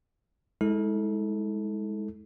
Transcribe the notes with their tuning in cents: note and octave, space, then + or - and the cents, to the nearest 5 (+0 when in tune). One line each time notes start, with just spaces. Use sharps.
G#3 +0 E4 -40 A4 +0